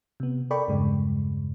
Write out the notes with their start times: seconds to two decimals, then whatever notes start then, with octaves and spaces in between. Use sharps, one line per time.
0.20 C3 B3
0.51 A4 A#4 D5 G5 B5 C#6
0.68 E2 G2 C#3 G#3